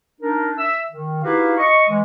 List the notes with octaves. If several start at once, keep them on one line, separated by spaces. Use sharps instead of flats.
D4 D#4 A#4
E5 E6
D#3
D#4 E4 F#4 G4 B4 F5
D#5 C#6
E3 G#3